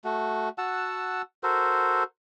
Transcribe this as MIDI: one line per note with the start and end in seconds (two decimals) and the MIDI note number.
0.04 0.49 57
0.04 0.49 66
0.58 1.22 66
0.58 1.22 78
0.58 1.22 81
0.58 1.22 88
1.43 2.03 66
1.43 2.03 69
1.43 2.03 70
1.43 2.03 72